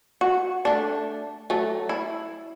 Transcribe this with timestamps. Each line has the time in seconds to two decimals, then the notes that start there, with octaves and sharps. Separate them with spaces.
0.21 F#4
0.65 A3 D4
1.50 F#3 A3
1.89 E4